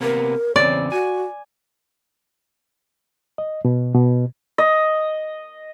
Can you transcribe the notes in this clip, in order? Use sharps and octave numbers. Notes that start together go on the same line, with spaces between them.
C3 A#3 B3 A#4
E2 C#3 C4 C#5 D5
F#4 G#5
D#5
B2
B2
D#5